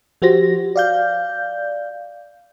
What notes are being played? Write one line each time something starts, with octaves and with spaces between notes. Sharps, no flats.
F3 F#4 G4 C5 A#6
D5 F5 G6